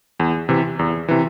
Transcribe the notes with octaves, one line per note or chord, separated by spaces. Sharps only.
E2
C3 E3
E2
C3 E3